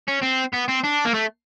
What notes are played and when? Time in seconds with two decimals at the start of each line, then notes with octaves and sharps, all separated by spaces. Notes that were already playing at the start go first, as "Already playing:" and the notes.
0.08 C#4
0.23 C4
0.54 B3
0.69 C4
0.84 D4
1.05 A#3
1.14 A3